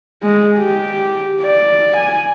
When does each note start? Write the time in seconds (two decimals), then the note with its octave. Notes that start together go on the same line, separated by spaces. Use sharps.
0.22 G#3
0.59 G4
1.41 D5
1.96 G#5